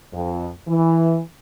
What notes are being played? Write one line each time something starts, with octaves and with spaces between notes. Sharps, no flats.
F2
E3